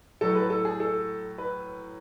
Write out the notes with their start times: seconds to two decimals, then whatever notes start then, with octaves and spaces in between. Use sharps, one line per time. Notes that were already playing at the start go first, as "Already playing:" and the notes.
0.21 A2 F#3 A4
0.35 B4
0.50 A4
0.65 G#4
0.80 A4
1.38 B4